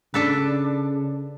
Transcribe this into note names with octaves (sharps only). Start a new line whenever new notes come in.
C#3 D4 A4 B4